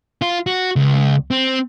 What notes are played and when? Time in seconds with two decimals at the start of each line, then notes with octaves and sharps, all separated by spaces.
0.22 F4
0.47 F#4
0.76 C#2
1.31 C4